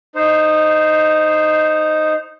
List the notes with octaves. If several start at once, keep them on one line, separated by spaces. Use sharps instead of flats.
D#4 C5